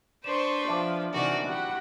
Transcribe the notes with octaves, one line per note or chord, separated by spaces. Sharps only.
D4 B4 C5 C6 C#6 E7
F3 E5 A5 D6
C3 D#3 E3 F#4 D5
E4 F#4 G4 F#5